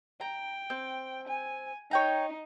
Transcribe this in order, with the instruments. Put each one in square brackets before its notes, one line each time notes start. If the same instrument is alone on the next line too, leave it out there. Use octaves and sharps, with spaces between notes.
[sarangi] G5 [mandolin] A#5
[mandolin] C4
[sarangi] G#5
[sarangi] D#4 [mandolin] C#5 G5 A#5